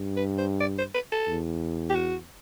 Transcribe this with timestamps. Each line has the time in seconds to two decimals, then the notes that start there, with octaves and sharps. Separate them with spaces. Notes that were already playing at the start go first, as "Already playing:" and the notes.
Already playing: G2
0.17 B4
0.38 C5
0.60 D5
0.78 C5
0.94 B4
1.12 A4
1.28 E2
1.89 G4
1.95 F#4